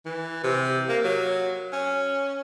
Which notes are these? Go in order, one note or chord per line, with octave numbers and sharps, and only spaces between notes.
E3
C3
A#3
F#3
C#4